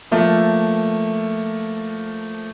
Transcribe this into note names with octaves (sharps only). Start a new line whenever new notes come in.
F3 A3 A#3 A4